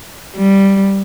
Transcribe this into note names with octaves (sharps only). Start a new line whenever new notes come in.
G3